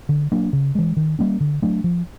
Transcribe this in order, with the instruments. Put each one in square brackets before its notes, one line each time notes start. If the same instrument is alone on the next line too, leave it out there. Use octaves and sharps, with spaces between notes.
[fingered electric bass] D3
F#3 A#3 D4
C#3
E3 G#3
D#3
G3 A#3 C#4
D3
F#3 A3 D4
F3